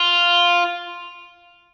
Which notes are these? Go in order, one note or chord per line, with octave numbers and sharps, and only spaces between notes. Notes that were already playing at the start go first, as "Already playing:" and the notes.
Already playing: F4